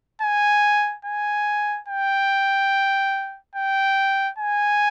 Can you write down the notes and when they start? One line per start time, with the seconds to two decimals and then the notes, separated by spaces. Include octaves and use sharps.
0.21 G#5
1.05 G#5
1.88 G5
3.55 G5
4.38 G#5